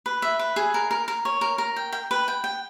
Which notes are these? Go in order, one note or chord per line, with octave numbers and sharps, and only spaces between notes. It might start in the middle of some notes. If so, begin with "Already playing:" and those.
B4
E5
B4
G#4
A#4
A#4
A#4
C#5
A#4
A#4
G5
G5
B4
G5
G5